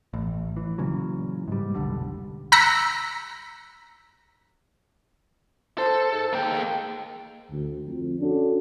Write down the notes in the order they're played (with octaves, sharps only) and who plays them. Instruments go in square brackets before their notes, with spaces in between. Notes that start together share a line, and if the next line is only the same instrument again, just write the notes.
[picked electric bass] A1
E3
A#2 C#3 E3 F#3
G#2 G3
F1 B1 D3 G3
[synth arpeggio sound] A#5 E6 F#6 A#6 B6 C#7
[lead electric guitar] A4 [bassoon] C5
[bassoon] G#2
[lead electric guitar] A#3 G5
[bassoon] G#3
[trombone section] D2
F2
C#4 D4 F#4 A4